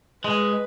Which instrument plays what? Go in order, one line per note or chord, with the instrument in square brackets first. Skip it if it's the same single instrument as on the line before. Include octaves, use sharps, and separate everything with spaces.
[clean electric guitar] G#3 [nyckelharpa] B4